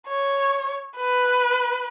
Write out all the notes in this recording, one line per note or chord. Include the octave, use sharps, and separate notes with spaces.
C#5
B4